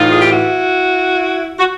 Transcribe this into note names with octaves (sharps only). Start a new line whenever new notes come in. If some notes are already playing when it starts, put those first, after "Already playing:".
Already playing: A2 E3 D#4 F4
G#4
G4
E4 F#4
F#4